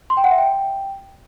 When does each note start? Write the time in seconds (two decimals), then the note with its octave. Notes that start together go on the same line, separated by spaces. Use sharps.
0.10 C6
0.17 G5
0.24 F#5
0.31 E5
0.38 G5